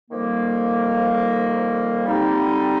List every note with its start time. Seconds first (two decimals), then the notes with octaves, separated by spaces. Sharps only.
0.10 F2 D#3 G3 A#3
2.06 D3 G3 C4 D#4